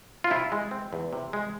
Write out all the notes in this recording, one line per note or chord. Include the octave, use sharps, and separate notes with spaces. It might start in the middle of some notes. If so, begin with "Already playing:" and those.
F4
C3 E4
G#3
C4
E2
C3
G#3